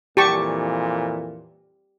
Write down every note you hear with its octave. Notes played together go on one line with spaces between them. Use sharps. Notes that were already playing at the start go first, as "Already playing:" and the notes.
F2 A#2 E3 G4 A5 C#6